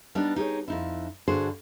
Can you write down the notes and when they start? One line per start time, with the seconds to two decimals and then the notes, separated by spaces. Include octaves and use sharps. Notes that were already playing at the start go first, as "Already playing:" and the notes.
0.15 G3 B3 D4 D#4
0.36 D#4 G4 G#4 C#5
0.68 F2 D#4 E4
1.28 G2 D3 F#4 G#4 C5